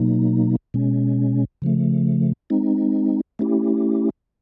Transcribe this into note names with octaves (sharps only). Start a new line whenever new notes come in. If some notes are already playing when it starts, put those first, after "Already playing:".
Already playing: B2 F#3 A#3 D#4
B2 G#3 C#4
C#3 F3 A3
G#3 C4 D#4
A3 C#4 E4 G4